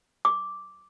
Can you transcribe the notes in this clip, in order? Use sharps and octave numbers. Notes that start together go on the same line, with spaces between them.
D6